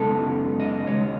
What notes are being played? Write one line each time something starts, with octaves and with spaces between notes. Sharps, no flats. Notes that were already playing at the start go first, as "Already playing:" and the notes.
Already playing: F#2 C#3 G#3 B3 D#4 A4
D#5
D#2 C#3 G#3 D#4 C#5